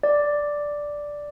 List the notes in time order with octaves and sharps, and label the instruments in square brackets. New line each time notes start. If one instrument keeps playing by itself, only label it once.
[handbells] D5